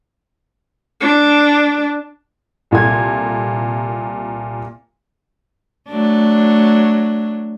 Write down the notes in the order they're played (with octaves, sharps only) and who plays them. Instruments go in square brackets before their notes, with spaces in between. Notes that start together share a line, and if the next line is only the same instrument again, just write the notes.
[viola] D4
[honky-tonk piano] C2 A#2 A4 G#6
[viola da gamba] F#3 A3 D4